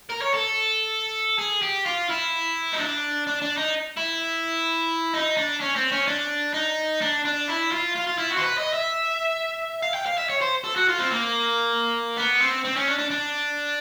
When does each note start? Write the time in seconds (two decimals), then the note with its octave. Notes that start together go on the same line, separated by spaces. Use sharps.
0.10 A#4
0.22 C#5
0.34 A4
1.39 G#4
1.62 G4
1.86 F4
2.09 E4
2.73 D#4
2.80 D4
3.27 D4
3.42 D4
3.57 D#4
3.97 E4
5.14 D#4
5.37 D4
5.60 C#4
5.76 C4
5.92 C#4
6.07 D4
6.54 D#4
7.01 D4
7.25 D4
7.48 E4
7.71 F4
7.95 F4
8.07 F4
8.18 E4
8.31 F#4
8.37 C5
8.42 B4
8.58 D#5
8.73 E5
9.83 F5
9.94 G5
10.06 F5
10.18 E5
10.29 C#5
10.41 C5
10.64 A4
10.76 F#4
10.88 F4
11.00 C4
11.11 A#3
12.17 B3
12.40 C4
12.64 C4
12.76 C#4
12.88 D4
12.98 D4
13.10 D4